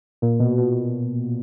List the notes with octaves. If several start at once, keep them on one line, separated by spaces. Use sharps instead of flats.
A#2
B2
B2